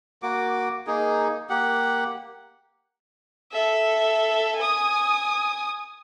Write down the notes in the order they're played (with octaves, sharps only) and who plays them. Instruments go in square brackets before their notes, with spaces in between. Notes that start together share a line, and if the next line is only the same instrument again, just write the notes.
[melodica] A#3 F#4 D6
A#3 D#4 G#4
A#3 G4 F#5
[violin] A4 E5
G#5 D#6